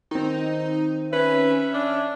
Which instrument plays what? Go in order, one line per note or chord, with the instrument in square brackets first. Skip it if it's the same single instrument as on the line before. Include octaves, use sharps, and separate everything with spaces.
[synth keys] D#3 C4 [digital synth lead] D#4
[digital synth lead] C#4 [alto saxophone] B4 [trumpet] E5
[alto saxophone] D4